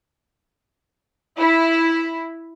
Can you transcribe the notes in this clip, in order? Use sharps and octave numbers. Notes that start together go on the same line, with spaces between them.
E4